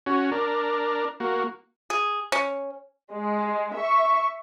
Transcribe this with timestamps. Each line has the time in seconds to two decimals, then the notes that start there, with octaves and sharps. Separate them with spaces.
0.06 C#4 F#4
0.32 D4 A#4
1.20 A#3 F#4
1.90 G#4
2.32 C#4
3.12 G#3
3.75 E5 C#6